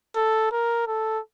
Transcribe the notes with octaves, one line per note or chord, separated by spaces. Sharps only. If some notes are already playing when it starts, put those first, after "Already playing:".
A4
A#4
A4